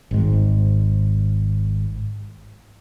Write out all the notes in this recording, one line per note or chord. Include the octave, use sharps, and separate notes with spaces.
G#1 G#2